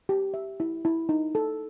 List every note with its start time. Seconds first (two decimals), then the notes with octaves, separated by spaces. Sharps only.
0.09 G4
0.34 E5
0.60 E4
0.85 E4
1.09 D#4
1.35 A4